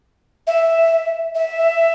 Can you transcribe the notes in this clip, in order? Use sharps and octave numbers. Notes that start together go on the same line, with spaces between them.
E5
E5